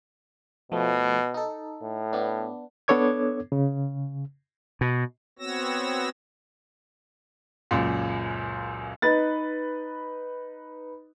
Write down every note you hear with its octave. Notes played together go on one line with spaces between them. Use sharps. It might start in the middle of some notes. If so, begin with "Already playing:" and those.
B2 F3 A3
D#4 A4
A2
B3 D4
B3 D4 A4 C#5 D6 G#6
C#3
B2
B3 C4 F#4 C#5 E6 A#6
C#2 F#2 A#2
D#4 B4 A6